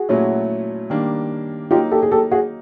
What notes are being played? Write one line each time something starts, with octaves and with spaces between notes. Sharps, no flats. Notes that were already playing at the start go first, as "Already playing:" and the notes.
Already playing: F#4 G#4
A#2 F#3 A3 C#4 E4
D#3 G3 A#3 D4
F#3 A#3 D#4 F4 G4
G4 A4
G#4
G4 A4
F#4 G#4